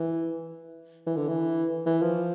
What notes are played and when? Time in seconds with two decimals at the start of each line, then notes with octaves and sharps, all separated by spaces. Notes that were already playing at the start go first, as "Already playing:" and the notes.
Already playing: E3
1.06 E3
1.17 D3
1.28 E3
1.86 E3
2.02 F3